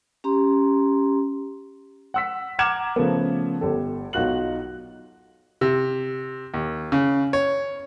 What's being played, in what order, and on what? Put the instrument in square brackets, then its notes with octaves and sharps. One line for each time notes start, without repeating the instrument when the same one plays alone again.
[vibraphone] C#4 G4 A#5 C6
[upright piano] F#5 E6 B6
F#5 A#5 D6 F6 G#6 E7
C#3 F3 A3 B3
G1 G4 A4
B1 D#4 F4 F#4 F#6 F#7
[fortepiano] C3
D#2
C#3
C#5